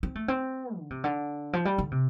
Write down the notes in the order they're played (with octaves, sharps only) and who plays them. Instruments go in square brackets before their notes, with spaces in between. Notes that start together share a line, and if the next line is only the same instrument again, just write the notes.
[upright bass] C4
A3
C4
D3
C3
D3
F3
G3
D3
C3